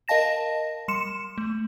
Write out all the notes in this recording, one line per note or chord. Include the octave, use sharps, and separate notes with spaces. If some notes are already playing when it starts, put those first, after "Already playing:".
A#4 D#5 F5 A5 A#6 E7
G3 C6 C#7 E7
A3